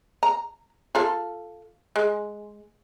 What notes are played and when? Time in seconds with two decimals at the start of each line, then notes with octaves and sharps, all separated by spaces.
0.23 A#5
0.95 F4 A4 F5
1.96 G#3